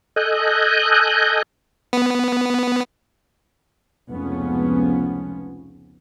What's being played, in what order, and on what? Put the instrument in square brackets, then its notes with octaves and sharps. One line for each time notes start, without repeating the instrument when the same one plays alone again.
[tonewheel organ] A4 D#5 G#5 F#6 G6
[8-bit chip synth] B3
[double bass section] F1 C#2 F3 B3 C#4